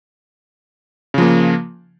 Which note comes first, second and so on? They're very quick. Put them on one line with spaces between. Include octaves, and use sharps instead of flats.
C#3 F3 A#3